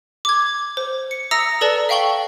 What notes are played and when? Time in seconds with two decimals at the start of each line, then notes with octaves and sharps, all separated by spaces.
0.25 D6 G#6
0.77 C5
1.11 C#7
1.31 E5 A#5 D#6 E6 A#6 C#7
1.61 A4 B4 D5 A5 A#5
1.89 E5 F5 G5 C#6 F#7 G7